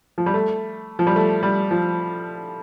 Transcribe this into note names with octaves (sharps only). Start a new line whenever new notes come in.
F3
G3
A3
F3
G3
A3
G3
F3